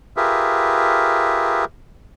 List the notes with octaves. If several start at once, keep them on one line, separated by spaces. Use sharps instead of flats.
F4 G4 G#4 A#4 B4 E5